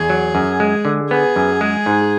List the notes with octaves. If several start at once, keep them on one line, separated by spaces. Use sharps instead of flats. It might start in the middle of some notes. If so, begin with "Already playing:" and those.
Already playing: E2 G#4
F#3
F#2
G#3
D3
B3 G#4
F#2
G#3
G#2